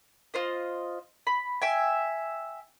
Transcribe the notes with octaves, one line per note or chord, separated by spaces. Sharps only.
F4 C5 D#5
B5
E5 G5 G#5